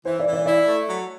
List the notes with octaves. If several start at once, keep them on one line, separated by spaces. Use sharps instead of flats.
E3 C5
D5
E3
D5
E4 D5
A3
F#3